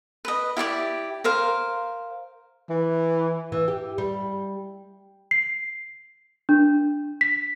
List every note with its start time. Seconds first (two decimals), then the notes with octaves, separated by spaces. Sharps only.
0.25 B4 D#5
0.57 E4 G4 D5 D6
1.24 A#4 C5 F5
2.70 E3
3.52 E3
3.68 G4
3.98 G3
5.31 C7
6.49 D4
7.21 B6